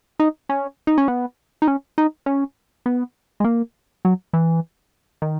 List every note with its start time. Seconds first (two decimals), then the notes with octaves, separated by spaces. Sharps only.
0.20 D#4
0.49 C#4
0.87 D#4
0.98 C#4
1.08 B3
1.62 D#4
1.68 C#4
1.98 D#4
2.26 C#4
2.86 B3
3.40 G#3
3.44 A#3
4.05 F#3
4.33 E3
5.22 D#3